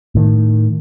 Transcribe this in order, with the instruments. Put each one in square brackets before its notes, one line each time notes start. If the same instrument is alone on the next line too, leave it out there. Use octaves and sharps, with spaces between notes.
[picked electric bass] A2 D#3